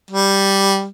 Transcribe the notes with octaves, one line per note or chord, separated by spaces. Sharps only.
G3